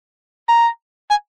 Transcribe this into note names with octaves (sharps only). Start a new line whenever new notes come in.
A#5
G#5